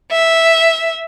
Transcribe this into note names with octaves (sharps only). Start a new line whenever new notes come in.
E5